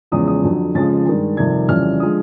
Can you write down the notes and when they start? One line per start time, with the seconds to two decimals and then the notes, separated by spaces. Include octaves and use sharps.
0.12 E2 C#3 F3 G#3 D#6
0.28 D#6
0.43 F2 D3 F#3
0.75 F2 C#3 F3 G#3 A6
1.06 G2 D#3 G#3
1.37 F2 C3 D#3 G3 G#6
1.68 F2 C#3 E3 G3 F6
2.00 D3 F3 G#3 D#6